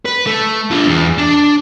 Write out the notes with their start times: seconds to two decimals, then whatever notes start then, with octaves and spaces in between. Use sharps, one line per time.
0.06 B4
0.27 A3
0.71 D4 F4
0.87 E2
1.18 D4